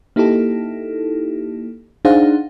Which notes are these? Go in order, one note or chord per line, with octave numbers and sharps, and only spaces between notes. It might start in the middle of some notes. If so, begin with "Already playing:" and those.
A#3 D#4 E4 G4 A4
D4 D#4 G#4 C5 F5 F#5